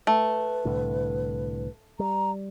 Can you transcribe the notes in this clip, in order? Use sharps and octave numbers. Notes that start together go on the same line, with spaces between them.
A3 B4
C2 A2 D3
G3 A#5